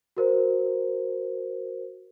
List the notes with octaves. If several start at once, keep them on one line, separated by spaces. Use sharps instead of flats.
F#4 A#4 C5